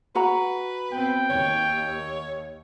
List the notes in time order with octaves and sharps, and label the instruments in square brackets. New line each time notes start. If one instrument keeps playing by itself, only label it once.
[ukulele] F#4 A#5 [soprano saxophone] B4
[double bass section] B3 C4 [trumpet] G5
[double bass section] D#2 [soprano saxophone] C#5